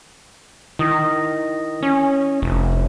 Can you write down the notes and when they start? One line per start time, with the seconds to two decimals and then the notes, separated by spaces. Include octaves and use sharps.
0.79 D#3 E4 D#6 A#6
1.83 C#4
2.42 F1